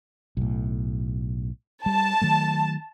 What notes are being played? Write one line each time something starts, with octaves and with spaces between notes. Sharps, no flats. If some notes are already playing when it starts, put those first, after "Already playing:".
B1 A2
G3 A5
D#3 F#3 A3